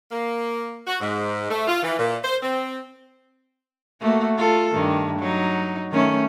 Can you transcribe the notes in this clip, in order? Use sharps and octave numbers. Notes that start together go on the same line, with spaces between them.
A#3
F#4
G#2
A3
F4
E3
A#2
C5
C4
A3 A#3 F#4
F4 A4
G2 D#3
F#3 D#4
D#3 A3 C#4